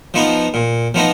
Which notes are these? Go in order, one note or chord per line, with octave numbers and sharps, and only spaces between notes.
F3 B3 D#4
A#2
F3 B3 D#4